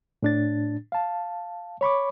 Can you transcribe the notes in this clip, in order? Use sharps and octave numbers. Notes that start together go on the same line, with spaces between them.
A2 D4 A6
F5 A5
C#5 B5 C#6 D6